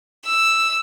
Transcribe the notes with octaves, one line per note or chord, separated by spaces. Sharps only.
E6